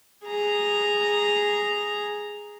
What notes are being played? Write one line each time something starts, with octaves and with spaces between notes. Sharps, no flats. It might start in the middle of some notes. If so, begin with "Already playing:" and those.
G#4 A#5